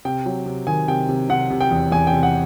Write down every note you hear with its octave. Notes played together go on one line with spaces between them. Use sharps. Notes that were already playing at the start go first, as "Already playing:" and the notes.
C3 G5
F#3
C3
D#3 G#5
C3 G5
C3
C3 F#5
C3
G5
E2
E2 G#5
G5
C3
F#5